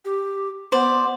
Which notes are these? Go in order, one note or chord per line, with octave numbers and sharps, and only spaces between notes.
G4
B3 C5 D5